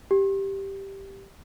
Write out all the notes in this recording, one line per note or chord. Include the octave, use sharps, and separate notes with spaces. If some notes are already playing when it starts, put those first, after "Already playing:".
G4